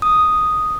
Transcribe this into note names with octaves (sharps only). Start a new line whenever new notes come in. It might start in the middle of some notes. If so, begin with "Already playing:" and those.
D#6